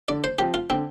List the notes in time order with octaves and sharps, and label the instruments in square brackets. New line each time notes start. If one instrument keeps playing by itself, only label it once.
[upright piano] D3 [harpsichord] D5
[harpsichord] C5
[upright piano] F3 C4 F4 [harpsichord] G4
[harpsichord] F4
[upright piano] D3 [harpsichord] C4